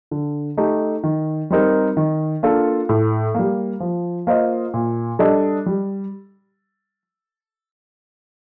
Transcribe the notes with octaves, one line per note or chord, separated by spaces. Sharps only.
D3
A3 D#4 G4
D#3
G3 C4 D#4 A#4
D#3
A#3 D4 F4 A4
A2
G3 A#3
F3
A#3 F4 C5 D#5
A#2
G3 D4 A4 D#5
G3